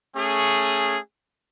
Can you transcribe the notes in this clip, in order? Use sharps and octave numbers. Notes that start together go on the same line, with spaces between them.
A3 C#4 G#4